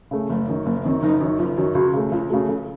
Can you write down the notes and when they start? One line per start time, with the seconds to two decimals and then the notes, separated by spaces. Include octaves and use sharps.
0.11 C#3 A3
0.29 F#1 A3
0.48 F#2 D#3
0.65 F#1 A#3
0.84 F#2 D#3 C4
1.02 F#1 D#4
1.20 F#2 D#3
1.38 F#1 F4
1.57 F#2 D#3 F#4
1.75 C#2 F#4
1.93 C#3 A3
2.12 C#2 F4
2.29 C#3 A3 F#4
2.48 C#2 A4